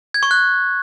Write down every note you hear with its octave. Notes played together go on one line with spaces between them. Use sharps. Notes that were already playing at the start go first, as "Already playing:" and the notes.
G#6
C#6
F#6